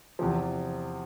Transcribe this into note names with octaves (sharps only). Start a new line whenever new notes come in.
E2 C3 F3